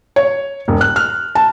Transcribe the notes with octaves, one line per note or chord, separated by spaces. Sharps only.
C#5
E1
F#6
F6
A5